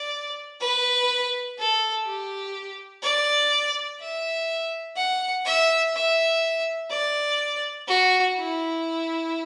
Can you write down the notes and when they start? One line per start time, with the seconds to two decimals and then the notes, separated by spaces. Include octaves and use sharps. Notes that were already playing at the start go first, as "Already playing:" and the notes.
Already playing: D5
0.60 B4
1.58 A4
2.06 G4
3.03 D5
4.00 E5
4.97 F#5
5.45 E5
5.94 E5
6.91 D5
7.88 F#4
8.36 E4